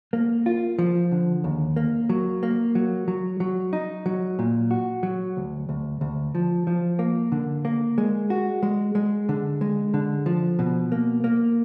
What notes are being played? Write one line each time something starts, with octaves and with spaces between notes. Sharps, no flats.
A#3
F4
F3
D3
D#2
A#3
F#3
A#3
F#3
F#3
F#3
D#4
F#3
A#2
F#4
F#3
D2
D2
D2
F3
F3
A#3
D3
A#3
G#3
F#4
G#3
G#3
D3
G#3
D3
F3
B2
A#3
A#3